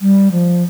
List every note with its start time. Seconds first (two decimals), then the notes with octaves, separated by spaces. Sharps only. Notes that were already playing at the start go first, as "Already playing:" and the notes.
0.02 G3
0.32 F3